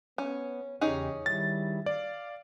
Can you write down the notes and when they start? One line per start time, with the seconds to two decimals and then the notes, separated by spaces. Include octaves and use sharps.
0.18 B3 C#4
0.81 E2 C#3 C#4 D#4 G4 G#4
1.26 D#3 G3 E4 A6
1.86 D5 F5